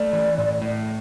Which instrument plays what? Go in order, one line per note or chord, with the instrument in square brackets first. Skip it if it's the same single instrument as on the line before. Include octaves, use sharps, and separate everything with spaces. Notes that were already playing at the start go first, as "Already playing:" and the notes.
Already playing: [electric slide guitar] A3 [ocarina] D5
[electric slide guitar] E3
A2
A2